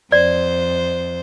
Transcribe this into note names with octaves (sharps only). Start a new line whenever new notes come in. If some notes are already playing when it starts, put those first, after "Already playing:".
F2 C5 D5